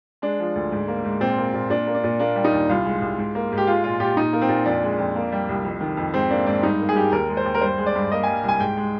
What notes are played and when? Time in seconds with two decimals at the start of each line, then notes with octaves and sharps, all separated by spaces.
0.22 G#3 D4
0.40 F3
0.56 D2
0.72 G#2
0.88 A#3
1.04 G#2
1.20 A#2 C4
1.38 A#3
1.54 A#2
1.70 A#2 D4
1.87 A#3
1.94 D4
2.04 A#2
2.19 A#3 D4
2.35 G3
2.44 D#4
2.53 D#2
2.69 C2 F4
2.85 G#3
3.02 C2
3.18 G#2
3.35 A#3
3.52 G#2
3.57 G4
3.67 G#3 F4
3.84 A#2 F4
4.00 A#2 G4
4.17 A#2 D#4
4.33 A#3
4.42 C4
4.49 A#2
4.65 F2 D4
4.83 G#3
4.98 F2
5.15 A#3
5.32 G3
5.49 C2
5.64 F2
5.80 D#3
5.97 F2
6.14 G#2 C4
6.30 A#3 D4
6.46 G#2 D4
6.63 G2 D#4
6.79 A#3
6.89 G#4
6.95 G2 G4
7.12 D#2 A#4
7.29 G#3
7.37 C5
7.46 D#2
7.55 A#4
7.61 G2 C5
7.78 G#3
7.86 D5
7.95 G2
8.11 A#3 D#5
8.23 G3 G#5
8.44 C2 G#5
8.60 G#2 G5
8.77 G#3